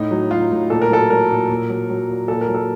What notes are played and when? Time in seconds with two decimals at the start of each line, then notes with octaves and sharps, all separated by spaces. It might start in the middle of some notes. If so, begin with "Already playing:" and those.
Already playing: A2 D#4
0.11 F#3
0.31 F#3 F4
0.51 A2
0.70 A#2 A4
0.82 A#4
0.90 F#3 A4
1.10 F#3 A#4
1.30 A#2
1.49 A#2
1.69 F#3
1.90 F#3
2.09 A#2
2.28 A#2 A4
2.41 A#4
2.48 F#3
2.55 A4